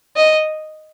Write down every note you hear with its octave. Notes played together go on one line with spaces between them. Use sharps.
D#5